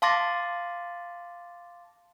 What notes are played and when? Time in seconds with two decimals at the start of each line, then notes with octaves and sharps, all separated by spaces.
0.02 F5 A5 C6 D6 A6 A#6